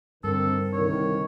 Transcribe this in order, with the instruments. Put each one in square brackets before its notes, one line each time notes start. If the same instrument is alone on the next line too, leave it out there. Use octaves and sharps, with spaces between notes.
[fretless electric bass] G2 [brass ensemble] D3 D#3 C4 [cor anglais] A4 [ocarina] A#4
[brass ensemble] C2 D3 D#3 [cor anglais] C#5